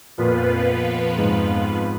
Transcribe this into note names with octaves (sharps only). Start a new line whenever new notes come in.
F2 A#2 F3 B3 F4 B4
G#2